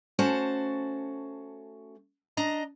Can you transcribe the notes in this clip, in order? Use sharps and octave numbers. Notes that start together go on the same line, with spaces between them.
A3 C#4 F#4 C5 A5
D4 D#5 A#5